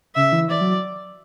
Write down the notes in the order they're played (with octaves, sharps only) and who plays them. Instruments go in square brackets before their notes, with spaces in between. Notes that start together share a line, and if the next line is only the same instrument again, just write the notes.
[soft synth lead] C#3 [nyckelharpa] E5
[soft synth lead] E3
[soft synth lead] E3 [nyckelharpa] D5
[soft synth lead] F#3